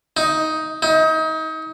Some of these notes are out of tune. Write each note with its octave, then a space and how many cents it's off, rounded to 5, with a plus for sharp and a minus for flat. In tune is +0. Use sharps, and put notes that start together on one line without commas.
D#4 +10
D#4 +30